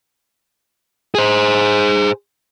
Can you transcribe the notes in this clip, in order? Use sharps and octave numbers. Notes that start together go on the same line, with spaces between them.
G#4 C5